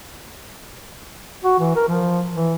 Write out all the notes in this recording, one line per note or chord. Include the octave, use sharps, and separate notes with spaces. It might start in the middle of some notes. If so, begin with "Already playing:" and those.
F#4
E3
A#4
F3
E3